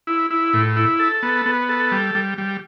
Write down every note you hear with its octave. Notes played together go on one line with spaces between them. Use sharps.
E4
E4
A2
E4
A4
B3
B3
A4
G3
G3
G3